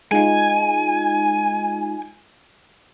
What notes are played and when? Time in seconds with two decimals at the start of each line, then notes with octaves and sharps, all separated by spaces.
0.11 G#3 D#4 F4 G#5